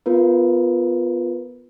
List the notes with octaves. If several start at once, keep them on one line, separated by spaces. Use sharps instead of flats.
B3 F4 A#4 B4